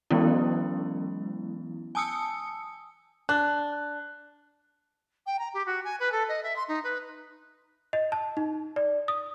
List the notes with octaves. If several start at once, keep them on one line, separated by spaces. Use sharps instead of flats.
E3 F#3 G#3 B3 C#4 E4
G#5 A5 D#6 E6 C#7
D4 F#6
G5
A#5
G4
F#4
G#5
B4
A4
D#5
E5
C6
D#4
B4
D#5
A5
D#4
D5
D#6